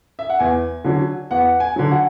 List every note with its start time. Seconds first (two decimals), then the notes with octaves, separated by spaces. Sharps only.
0.19 E5
0.30 F#5
0.39 E2 G#5
0.84 D3 F#3
1.31 E2 F#5
1.60 G#5
1.76 D3 F#3
1.91 F#5